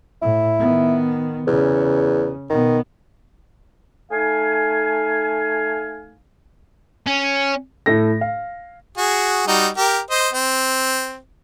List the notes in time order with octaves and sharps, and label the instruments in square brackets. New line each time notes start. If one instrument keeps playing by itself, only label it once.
[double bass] A2 [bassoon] E4
[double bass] D#3 B3
[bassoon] E2 [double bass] C#3
[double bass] B2 B3 [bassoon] D#3
[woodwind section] A3 D#4 F5 G#5
[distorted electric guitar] C#4
[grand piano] A2 A4 A#6
F5
[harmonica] F#4 G#4
G3 D#4 F#4
G4 A#4
C5 D#5
C4